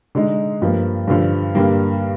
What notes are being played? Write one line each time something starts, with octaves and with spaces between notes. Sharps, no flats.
D3 G#3 D#4
G2 F3 A#3
G2 D3 F3
G2 D3 G3 A#3